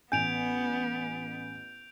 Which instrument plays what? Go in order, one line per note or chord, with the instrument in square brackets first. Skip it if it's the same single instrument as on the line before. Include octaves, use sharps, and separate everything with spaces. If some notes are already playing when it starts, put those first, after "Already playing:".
[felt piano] A1 G#5 [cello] B3 [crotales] G6 D7 F7